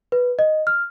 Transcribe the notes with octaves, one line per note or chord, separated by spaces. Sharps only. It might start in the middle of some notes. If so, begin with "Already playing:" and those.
B4
D#5
F6